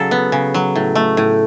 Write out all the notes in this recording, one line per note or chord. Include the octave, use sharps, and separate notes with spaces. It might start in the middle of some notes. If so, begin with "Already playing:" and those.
Already playing: C#3 F#3 A4
B3
C#3
F#3
A2
A3
A2